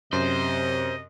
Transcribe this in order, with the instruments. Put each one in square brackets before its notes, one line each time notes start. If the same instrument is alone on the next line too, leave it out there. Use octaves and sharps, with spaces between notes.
[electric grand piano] F#2 [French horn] C3 [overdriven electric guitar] C5 [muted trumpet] D#5